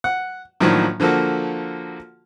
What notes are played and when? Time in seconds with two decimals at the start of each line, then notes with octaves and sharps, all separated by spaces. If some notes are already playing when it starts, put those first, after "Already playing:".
0.04 F#5
0.60 A2 D#3 F3 F#3 A#3 D4
1.00 D3 F3 A#3 F#4 A4